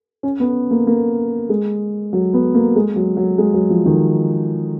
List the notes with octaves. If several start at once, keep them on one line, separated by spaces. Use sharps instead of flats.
C#4
B3
A#3
A#3
G#3
F#3
B3
A#3
G#3
F#3
F#3
G#3
F#3
F3
D#3